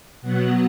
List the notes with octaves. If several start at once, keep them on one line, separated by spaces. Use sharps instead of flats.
B2 F#3 B3 F#5